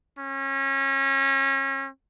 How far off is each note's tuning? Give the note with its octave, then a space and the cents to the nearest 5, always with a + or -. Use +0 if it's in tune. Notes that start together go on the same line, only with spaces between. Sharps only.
C#4 -30